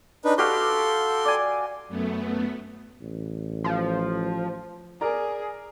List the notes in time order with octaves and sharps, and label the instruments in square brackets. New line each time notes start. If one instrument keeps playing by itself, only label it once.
[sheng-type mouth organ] D4 D#4 B4
[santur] F#4 G4 F5 [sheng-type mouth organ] A4 C6
[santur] D5 G#5
[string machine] F#2 A3 B3
[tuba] A1
[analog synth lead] F3
[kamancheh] G#4 [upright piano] A#4 D5 A#5